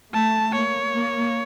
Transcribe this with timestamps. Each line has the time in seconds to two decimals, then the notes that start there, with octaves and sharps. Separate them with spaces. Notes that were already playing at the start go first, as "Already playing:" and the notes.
0.13 A3 A5
0.54 A#3 C#5
0.96 A#3